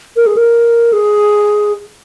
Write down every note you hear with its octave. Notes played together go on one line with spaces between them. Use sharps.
A#4
G#4
A#4
G#4